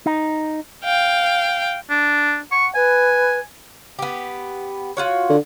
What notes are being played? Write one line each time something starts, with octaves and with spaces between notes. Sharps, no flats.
D#4
F5 G5
D4
F#5 C#6
B4 G#5
B3 G4
F4 F#4 C#5
D3